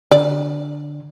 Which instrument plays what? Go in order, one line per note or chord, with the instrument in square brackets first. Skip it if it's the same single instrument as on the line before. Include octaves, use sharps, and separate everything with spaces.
[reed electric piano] D3 [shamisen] D5